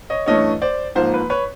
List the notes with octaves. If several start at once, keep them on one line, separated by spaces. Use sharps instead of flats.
C#5 D#5
G2 E3 A3 C#4 C#5 D#5
C5 D5
G#2 F3 A#3 C5
B4
B4 C#5